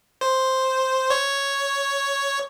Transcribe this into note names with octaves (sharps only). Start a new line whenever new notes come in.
C5
C#5